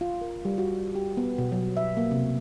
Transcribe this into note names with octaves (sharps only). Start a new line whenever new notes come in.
F4
A#4
G3
F#4
G4
B3
B2
F#3
E5
A#3
C3